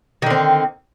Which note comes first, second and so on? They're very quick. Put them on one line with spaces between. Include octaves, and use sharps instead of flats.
D#3 D3 C4